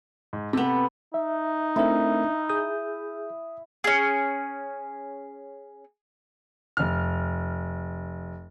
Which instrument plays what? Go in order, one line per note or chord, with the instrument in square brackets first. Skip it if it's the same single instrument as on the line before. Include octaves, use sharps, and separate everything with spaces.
[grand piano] G#2
[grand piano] C3 [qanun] B3 A4
[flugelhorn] D#4 [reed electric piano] E5
[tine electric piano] A3 C4 A#4 [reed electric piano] D4 [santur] E4
[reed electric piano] G#4 G6 [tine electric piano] D#6
[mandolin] C#4 G#4
[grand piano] F1 F6